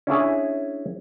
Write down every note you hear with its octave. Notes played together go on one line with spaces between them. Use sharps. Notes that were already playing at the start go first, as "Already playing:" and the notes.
C#4 D4 E4 G#4